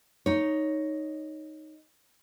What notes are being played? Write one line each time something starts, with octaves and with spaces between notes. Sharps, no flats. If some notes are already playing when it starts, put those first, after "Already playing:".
D#4 C#5